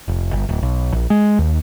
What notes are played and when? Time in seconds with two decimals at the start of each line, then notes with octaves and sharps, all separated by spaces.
0.08 F1
0.33 G1
0.49 D1
0.63 B1
0.92 A#1
1.10 G#3
1.39 D#2